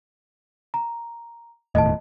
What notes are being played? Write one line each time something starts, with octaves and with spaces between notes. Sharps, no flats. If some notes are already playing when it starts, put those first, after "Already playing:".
A#5
E1 D#2 A2 D#5 A5